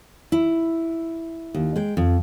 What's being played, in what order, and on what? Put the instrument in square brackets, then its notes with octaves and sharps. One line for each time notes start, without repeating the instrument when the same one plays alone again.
[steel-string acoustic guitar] E4
D#2
G#3 G5
F2